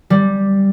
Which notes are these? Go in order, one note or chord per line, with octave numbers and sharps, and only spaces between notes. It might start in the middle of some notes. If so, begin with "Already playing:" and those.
G3